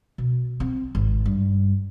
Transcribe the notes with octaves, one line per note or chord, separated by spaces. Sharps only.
B2
C4
G#1
G2